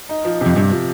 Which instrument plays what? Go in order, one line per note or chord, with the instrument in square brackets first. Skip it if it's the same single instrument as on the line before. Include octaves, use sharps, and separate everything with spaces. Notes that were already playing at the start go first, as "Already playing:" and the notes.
[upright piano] D#4
F3
C3
[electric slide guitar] F2
[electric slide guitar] G2 [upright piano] C3
[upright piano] F3